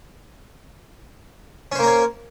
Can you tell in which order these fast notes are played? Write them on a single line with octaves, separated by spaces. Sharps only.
C#4 C5 A#3 A#4 C#5